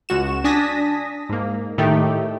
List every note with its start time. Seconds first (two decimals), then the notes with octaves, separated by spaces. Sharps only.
0.09 C#2 F#4 E7
0.44 D4 G#5 A5 D#6 A#6 B6
1.29 G#2 A#3
1.78 A2 D#3 A3 D#4 G4